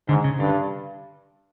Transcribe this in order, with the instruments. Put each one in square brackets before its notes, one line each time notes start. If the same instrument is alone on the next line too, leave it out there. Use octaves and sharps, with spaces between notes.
[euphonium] G#2 [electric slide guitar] D3
[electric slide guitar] C#3
[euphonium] G2 [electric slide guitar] D3